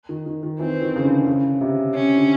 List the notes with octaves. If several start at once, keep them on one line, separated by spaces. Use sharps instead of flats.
D#3
D#3
D#3
E3 C4
D#3
C#3
D3
C#3
C3
C#4
D3